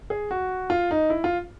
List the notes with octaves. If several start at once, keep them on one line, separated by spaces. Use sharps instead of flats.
G#4
F#4
F4
D#4
E4
F4